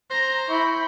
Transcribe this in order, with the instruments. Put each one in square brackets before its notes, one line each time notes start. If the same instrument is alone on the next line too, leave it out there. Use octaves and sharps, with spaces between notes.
[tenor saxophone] C5 [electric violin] A#5 A#6
[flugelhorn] E4 [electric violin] G5 B5 [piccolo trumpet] C#6